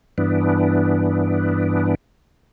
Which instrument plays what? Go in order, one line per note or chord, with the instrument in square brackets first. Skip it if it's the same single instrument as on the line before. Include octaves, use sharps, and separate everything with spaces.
[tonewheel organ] G2 E3 B3 D4